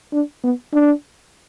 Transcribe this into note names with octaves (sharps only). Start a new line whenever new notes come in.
D4
B3
D4